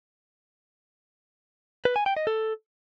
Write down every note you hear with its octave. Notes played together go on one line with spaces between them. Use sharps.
B4
G#5
G5
D#5
A4